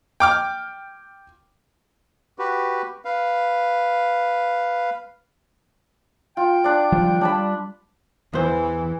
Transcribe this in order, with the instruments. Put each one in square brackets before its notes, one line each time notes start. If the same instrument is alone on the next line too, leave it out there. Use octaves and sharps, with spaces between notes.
[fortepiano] G5 D6 F6
[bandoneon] F#4 G4 B4
B4 F5
[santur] F4 [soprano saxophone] G5
[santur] D4 D5
[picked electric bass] D#3 F3 G3
[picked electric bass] G3 [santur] D4 A5 B5
[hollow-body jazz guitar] E2 C5 [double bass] E3